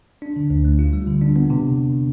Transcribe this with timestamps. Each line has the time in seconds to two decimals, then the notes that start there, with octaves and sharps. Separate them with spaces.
0.22 D4
0.36 D3
0.50 D2
0.65 A3
0.79 F4
0.93 G3
1.07 D3
1.22 D4
1.36 B3
1.50 C3